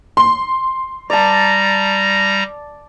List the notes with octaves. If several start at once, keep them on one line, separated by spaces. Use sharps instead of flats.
C6
G3 D5 A5 A#5 A#6